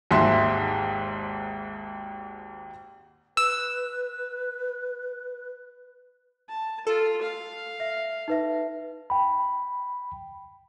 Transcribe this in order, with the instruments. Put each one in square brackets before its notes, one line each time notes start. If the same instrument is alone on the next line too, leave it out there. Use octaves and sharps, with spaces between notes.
[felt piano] G#1 D#2 G#2 E5 C6
[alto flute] B4 [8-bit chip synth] E6
[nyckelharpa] A5
[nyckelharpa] F4 [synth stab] A4
[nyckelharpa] F5
[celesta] E5
D#4 B4 E5
[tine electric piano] G5 B5